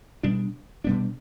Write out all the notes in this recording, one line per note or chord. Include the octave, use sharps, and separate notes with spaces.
B2 G3 B3 D4
B2 G3 B3 D4